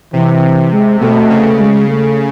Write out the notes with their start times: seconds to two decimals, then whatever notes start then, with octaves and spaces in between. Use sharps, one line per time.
0.13 C3 E3
0.43 C3
0.72 G#3
1.01 B2 A3
1.30 C#3
1.59 G#3
1.88 A3